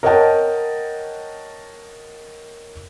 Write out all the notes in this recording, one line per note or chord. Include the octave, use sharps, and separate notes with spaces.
A#4 C#5 D#5 F#5 G5 A5